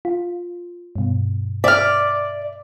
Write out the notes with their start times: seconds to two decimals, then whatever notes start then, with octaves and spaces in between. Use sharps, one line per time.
0.05 F4
0.96 G2 B2
1.64 D5 E5 F6